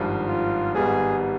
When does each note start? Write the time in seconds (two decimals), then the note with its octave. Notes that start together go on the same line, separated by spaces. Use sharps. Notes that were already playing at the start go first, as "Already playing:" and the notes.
Already playing: G#1 G2 F3
0.28 F4
0.75 G#1 G#2 G3 B3 G#4